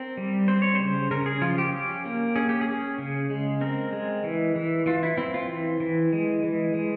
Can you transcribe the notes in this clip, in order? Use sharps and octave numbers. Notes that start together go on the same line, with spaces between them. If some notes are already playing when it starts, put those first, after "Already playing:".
Already playing: C4 A#4
G3
C4 C5
C#5
C#3 C5
C#3 A#4
G#4
F3 F4
G4
C#4
A#3
C#4 G#4
G4
G#4
C#4
C#3
G#3
C4 A#4
G#3
E3
E3
E3 F4
E4
C4 E4
F4
E3
E3
G#3
E3
G#3